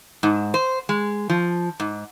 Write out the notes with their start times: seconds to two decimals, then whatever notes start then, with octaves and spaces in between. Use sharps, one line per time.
0.23 G#2
0.54 C5
0.89 G#3
1.30 F3
1.80 G#2